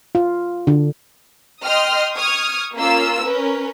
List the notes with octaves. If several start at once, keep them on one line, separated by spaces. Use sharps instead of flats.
F4
D3
D#5 G5 C6 D#6 F6
C#6 D#6 F6 G#6
A#3 C#4 F4 E6
C#4 A#4 B4